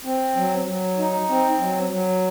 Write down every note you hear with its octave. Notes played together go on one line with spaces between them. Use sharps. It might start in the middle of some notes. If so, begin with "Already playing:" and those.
C4
F#3
F#3
D#4
C4
F#3
F#3